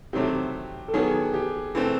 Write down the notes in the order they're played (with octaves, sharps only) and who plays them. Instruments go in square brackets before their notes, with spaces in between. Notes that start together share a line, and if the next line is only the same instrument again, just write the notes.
[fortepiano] C3 D#3 F#3 A3 C4 [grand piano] G4
[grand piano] A4
[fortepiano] D#3 F#3 B3 [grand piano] G#4
[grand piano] G4
[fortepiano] E3 A3 C4